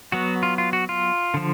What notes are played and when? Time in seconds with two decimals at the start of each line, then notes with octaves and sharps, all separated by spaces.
0.12 F#3 B3 F#4
0.43 F4
0.58 F4
0.73 F#4
0.89 F4
1.34 D3 F3